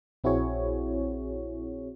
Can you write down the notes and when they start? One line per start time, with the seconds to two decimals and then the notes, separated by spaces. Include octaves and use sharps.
0.24 A#1 C4 E4 F#4 G#4 C#5